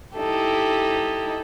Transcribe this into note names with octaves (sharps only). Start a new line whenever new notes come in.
D#4 E4 G4 A4